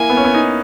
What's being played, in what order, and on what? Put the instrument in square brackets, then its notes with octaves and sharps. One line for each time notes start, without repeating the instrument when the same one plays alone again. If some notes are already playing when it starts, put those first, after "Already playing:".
Already playing: [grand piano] A#3 E4 [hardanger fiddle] G#5
[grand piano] B3
C#4
B3
D#4